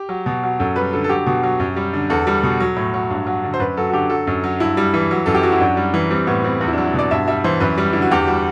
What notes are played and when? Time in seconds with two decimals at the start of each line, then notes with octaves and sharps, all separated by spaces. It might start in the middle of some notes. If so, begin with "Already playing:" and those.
Already playing: G4
0.09 F#3
0.26 B2
0.43 F#3
0.59 F#2 A4
0.76 G3 B4
0.93 D3 A4
1.04 A4
1.09 F#3 G4
1.26 B2
1.43 F#3
1.60 F#2
1.76 G3
1.93 D3
2.10 E2 A4
2.27 G3
2.43 B2
2.60 F#3
2.76 A2
2.94 F#3
3.10 G2
3.27 F#3
3.44 D3
3.54 C5
3.60 F#2 B4
3.77 F#3 A4
3.90 F#4
3.93 D3 G4
4.10 F#3 A4
4.27 F#2
4.44 F#3
4.60 G2 E4
4.77 G3
4.94 E3
5.11 F#3
5.26 F#2 A4
5.34 G4
5.43 F#3 F#4
5.52 E4
5.60 F#2 D4
5.77 G3
5.94 E3
6.10 G3 C4
6.27 A2 B3
6.44 G3 C4
6.61 E2 C4
6.68 E4
6.73 D4
6.78 F#3
6.86 E4
6.94 B2 D5
7.11 G2 E5
7.27 G3 E5
7.44 E3 C5
7.60 F#2 B4
7.78 G3
7.93 D3 E4
8.02 F#4
8.11 E2 G4
8.27 G3 F#4